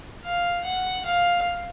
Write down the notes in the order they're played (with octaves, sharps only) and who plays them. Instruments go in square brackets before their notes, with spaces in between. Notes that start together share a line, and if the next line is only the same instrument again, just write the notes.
[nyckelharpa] F5
F#5
F5